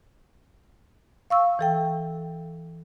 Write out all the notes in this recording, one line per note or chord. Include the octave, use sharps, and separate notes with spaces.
F5 C#6 E6
E3 A4 G5